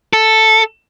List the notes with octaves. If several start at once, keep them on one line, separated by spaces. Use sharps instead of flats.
A4